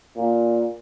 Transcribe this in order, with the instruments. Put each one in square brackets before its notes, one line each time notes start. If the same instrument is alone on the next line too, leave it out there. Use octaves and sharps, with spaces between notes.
[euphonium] A#2